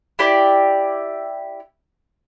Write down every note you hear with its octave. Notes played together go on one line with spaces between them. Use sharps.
E4 G4 D5